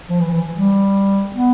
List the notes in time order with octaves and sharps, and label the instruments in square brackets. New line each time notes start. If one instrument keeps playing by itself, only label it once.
[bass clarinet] F3
E3
E3
G3
B3